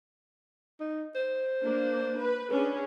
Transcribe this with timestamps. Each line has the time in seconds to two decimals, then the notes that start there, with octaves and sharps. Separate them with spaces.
0.80 D#4
1.15 C5
1.62 A#3 D4
2.19 B4
2.51 C#4 D4 G#4 B4